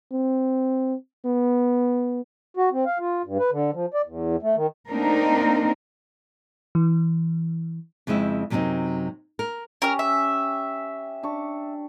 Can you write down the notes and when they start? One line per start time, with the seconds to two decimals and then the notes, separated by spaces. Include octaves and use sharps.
0.12 C4
1.26 B3
2.57 F#4
2.72 C4
2.86 F5
2.99 F4
3.24 G2
3.39 B4
3.52 D3
3.74 F3
3.94 D5
4.06 E2
4.42 A3
4.56 D#3
4.90 A3 A#3 C4 D4 D#4 A#4
6.75 E3
8.07 F2 C#3 G#3 C4 E4
8.50 F#2 C3 F#3 A#3 C4 D#4
9.39 A#4
9.82 C#4 G4 A#4 G#5 F6
9.99 E5
11.23 D4 C#6